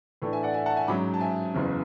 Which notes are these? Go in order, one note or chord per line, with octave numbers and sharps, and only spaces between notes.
A2 E3 A3 D4
E5 G#5
D5 F#5
E5 G#5
F#5 A5
E5 G#5
G#2 F#3 C#4 B5 D6
A5
E5 G#5
F#1 E2 C#3